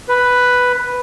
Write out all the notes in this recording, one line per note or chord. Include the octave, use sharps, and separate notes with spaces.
B4